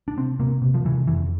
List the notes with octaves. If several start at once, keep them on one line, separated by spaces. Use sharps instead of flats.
D4
C3 C4
C3 A#3
C3
F3
C3 E3
F2 E3